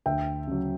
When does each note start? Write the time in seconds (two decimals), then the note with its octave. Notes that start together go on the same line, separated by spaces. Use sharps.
0.06 D2 E5 G5
0.47 C#3 F#3